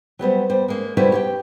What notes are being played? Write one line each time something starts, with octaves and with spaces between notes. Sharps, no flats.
F#3 G3 B3 C5
G3 C5
G#3 A#3 C#4
D3 G3 E4 F#4 B4 C5
G4 C#5 G5